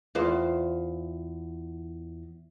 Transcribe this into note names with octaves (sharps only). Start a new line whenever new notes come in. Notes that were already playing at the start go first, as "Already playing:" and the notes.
E2 F4 C5